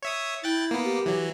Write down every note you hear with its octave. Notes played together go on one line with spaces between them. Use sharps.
C#5 E5 D#6
E4 G5 F#6 A6
A#3 B3
G4
E3 F#3